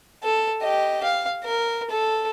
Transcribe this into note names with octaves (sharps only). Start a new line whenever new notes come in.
A4
G4 D#5
F5
A#4
A4